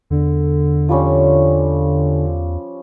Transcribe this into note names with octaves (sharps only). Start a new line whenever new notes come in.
E2 D3
F3 G3 C#4